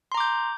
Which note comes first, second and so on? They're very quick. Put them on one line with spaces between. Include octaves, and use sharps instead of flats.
C6 A#5 D6 G6